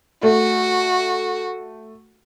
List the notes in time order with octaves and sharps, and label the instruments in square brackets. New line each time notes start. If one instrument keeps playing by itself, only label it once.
[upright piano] A3 [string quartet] F#4